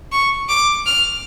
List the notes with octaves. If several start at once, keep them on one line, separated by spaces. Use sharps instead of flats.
C#6
D6
F6